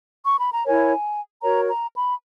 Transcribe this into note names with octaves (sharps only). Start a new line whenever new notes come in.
C#6
B5
A#5
E4 A#4 C#5 G#5
F#4 A#4 C#5 A#5
A#5
B5